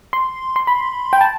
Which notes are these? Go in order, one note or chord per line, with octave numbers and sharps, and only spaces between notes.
C6
C6
B5
G5
A5